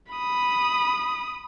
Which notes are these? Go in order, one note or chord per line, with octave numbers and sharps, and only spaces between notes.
B5 D#6